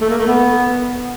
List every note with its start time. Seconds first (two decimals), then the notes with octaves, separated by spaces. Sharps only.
0.01 A3
0.10 A#3
0.18 A3
0.27 B3